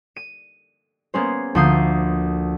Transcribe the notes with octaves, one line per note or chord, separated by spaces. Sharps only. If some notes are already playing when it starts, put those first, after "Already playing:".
D#7
A#3 B3 C#4 G#4 C5
D2 F3 A#3 D#6 G6 C7